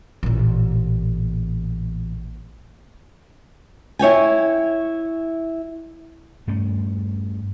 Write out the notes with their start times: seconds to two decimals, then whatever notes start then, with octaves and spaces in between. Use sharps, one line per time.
0.23 A1 A#2
3.99 E4 C#5 G5 G#5
6.47 G2 A3 C#4